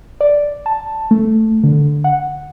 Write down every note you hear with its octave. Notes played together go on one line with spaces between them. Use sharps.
D5
A5
A3
D3
F#5